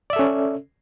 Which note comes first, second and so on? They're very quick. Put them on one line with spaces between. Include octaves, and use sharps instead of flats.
D5 E5 A4 C#4